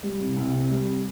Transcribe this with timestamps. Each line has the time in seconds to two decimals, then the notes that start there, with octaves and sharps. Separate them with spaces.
0.03 G3
0.20 C2
0.36 C2
0.54 C3
0.70 G3